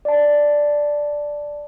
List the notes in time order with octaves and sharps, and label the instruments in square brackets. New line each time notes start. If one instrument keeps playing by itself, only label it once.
[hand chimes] D5 A5